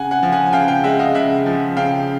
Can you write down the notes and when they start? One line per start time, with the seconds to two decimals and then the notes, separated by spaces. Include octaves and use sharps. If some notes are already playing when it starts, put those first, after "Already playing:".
Already playing: C#3 F#5 G#5
0.11 F#5 G#5
0.23 F3
0.32 F#5 G#5
0.46 G#5
0.53 C#3 F5 G5
0.68 F5 G5
0.84 G#3 E5 F#5
0.99 D#5 F5
1.14 C#3 E5 F#5
1.46 F3
1.77 C#3 F5 G5